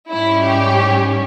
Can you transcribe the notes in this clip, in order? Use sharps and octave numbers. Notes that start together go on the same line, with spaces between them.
G#2 G3 C#4 E4
G4